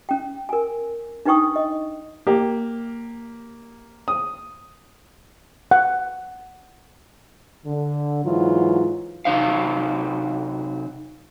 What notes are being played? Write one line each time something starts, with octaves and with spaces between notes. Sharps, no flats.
C#4 G5
A#4 G#5
D4 D#4 B4 G5 C#6 D#6
D#5
A#3 G4
D#6
F#5
D3
G#2 E3 F#3 F4
C3 F#3 D#4 C5 F5